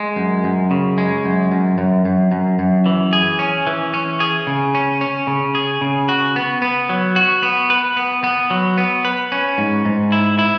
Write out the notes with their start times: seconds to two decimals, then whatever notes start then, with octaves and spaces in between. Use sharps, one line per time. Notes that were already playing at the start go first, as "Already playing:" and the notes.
Already playing: G#3
0.16 F#2
0.44 F#2
0.71 C#3
0.98 G#3
1.25 F#2
1.52 F#2
1.78 F#2
2.05 F#2
2.32 F#2
2.59 F#2
2.86 E3
3.13 G#4
3.39 C#4
3.67 E3
3.94 C#4
4.20 G#4
4.47 C#3
4.75 C#4
5.01 C#4
5.27 C#3
5.55 G#4
5.81 C#3
6.09 F#4
6.36 B3
6.62 B3
6.89 F#3
7.16 F#4
7.43 B3
7.70 B4
7.97 B3
8.24 B3
8.50 F#3
8.78 B3
9.05 B4
9.32 C#4
9.58 G#2
9.85 G#2
10.12 E4
10.39 E4